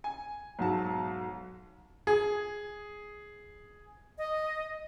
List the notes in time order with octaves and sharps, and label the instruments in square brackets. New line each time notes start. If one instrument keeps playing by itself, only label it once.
[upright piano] G#5
B1 G#2 F#3 A5
G#4
[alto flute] D#5